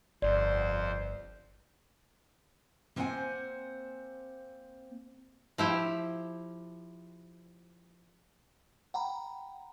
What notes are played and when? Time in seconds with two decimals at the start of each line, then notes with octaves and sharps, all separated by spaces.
0.22 G1 F2 C5 D5
2.96 A#3 C4 C5 C#5 F#5 G#5
5.58 F3 E4 G4
8.94 F#5 G5 A#5 B5